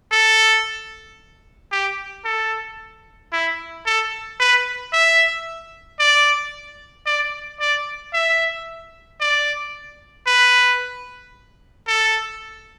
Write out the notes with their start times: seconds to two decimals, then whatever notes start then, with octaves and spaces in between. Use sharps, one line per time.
0.12 A4
1.72 G4
2.25 A4
3.32 E4
3.86 A4
4.40 B4
4.93 E5
6.00 D5
7.06 D5
7.60 D5
8.14 E5
9.20 D5
10.27 B4
11.87 A4